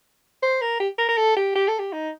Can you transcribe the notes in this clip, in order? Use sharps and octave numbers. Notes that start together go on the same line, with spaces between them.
C5
A#4
G4
A#4
A#4
A4
G4
G4
A4
G4
D#4